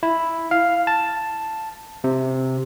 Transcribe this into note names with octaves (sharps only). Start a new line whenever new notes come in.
E4
F5
A5
C3